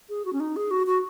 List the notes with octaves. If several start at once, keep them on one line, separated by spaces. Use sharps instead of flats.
G#4
F#4
C#4
D#4
G#4
F#4
F#4